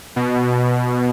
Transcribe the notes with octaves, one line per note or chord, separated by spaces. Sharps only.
B2